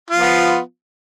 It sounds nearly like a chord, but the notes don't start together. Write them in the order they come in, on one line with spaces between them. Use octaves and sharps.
F4 F3 B3